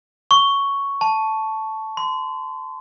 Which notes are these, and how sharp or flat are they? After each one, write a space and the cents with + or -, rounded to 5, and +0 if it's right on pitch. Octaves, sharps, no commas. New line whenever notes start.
C#6 +5
A5 -5
C6 -35